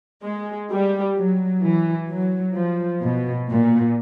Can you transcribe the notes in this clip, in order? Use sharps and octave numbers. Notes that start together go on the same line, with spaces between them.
G#3
G3
F#3
E3
F#3
F3
B2
A#2